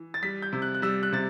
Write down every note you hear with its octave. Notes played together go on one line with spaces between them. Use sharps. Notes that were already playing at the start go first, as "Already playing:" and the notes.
Already playing: E3
A6
G3 B6
G6
C3
F#6
F#6
G3 E6
F#6
C3 A6